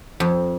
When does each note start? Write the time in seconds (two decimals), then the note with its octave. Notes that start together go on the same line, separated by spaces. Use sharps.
0.20 F2